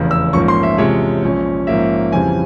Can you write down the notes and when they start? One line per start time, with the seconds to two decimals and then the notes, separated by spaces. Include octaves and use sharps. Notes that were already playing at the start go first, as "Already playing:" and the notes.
Already playing: F1 E2 C#3
0.11 E6
0.33 A#1 G#2 F3 A#3 C#4 C#6
0.48 C6
0.63 E5
0.78 E2 C3 F3 G#3 C#4 C#5
1.23 A#1 A#2 G#3 C#4
1.67 A#1 G#2 F3 A#3 C#4 E5
2.12 F2 C#3 E3 G3 C4 G#5